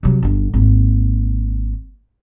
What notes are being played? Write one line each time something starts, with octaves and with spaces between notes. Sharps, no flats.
C3 F#3
G1 D3
G#1 A#3